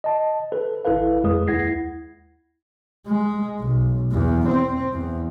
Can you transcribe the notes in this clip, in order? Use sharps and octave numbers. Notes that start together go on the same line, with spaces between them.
D#5 A5
A4 B4
G#1 E4 A4 B4 F5
F2 G#3 G#4 B4 D#6
D#2 E4 F#5 G#6 A#6 C7
G#3
B1
E2
C4
E2